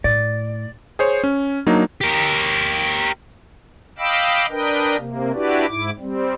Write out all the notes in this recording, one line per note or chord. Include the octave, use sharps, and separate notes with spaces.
A2 D5
G#4 C5 C#5
C#4
F#3 A#3 D4 D#4
G4 A#4
D#5 F5 G5 B5 D6 E6
D4 A#4 B4 D#5 G5
C3 A#3
D4 E4 F#4 G4 B4 D5
G#2 E4 D6
G3 C4